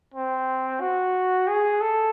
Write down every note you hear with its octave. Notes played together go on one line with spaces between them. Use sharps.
C4
F#4
G#4
A4